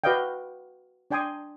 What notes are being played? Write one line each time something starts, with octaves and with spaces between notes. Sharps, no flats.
F#4 B4 D5 D#5 F5 G5
D4 D5 G5 G#5 C6 D#6